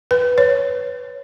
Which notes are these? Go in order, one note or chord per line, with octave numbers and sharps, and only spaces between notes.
B4
C#5